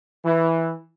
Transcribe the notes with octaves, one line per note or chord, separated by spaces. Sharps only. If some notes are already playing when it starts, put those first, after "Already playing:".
E3